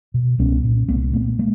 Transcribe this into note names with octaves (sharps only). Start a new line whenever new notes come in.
B2
C2 B3 C#4
A#2
C2 A#3 C4
A#2 A3 B3
G#3 A#3